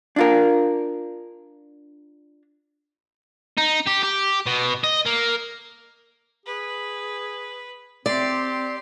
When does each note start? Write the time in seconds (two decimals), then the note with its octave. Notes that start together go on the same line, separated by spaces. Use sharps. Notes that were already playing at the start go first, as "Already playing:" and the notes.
0.16 D4 F4 A#4
3.58 D#4
3.87 G4
4.03 G4
4.46 B2
4.84 D#5
5.06 A#3
6.46 G#4 B4
8.06 C4 G4 D5 C6